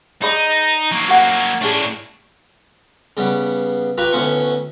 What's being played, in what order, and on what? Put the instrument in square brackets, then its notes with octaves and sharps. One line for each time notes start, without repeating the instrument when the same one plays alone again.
[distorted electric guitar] D#4 [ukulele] G#4 D5 B5
[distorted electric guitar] F#3 A#3
[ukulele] F#4 F#5
[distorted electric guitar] A2 D4 [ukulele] C#4 G#4
[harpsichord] C#3 G3 B3
F4 G4 B4 A#5 C#6
D2 A2 B3 C#4 C6 C#6